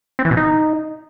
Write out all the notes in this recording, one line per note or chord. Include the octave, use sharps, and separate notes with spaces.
C4
E3
B2
D#4